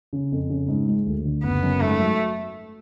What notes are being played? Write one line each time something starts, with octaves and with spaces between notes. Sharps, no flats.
C#3
F2
C#3
G#2
G#3
D2
D3
F#1 B3
F#2
G#2 A3
F#3